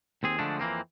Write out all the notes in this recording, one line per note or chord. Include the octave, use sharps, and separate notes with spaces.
D#2 C4 G#4
D3 F3 G#3 A3 D4
F2 E3 A#3 C4